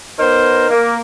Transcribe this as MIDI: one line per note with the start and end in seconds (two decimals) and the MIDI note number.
0.19 0.69 59
0.19 0.69 63
0.19 0.69 70
0.19 0.69 72
0.69 0.97 58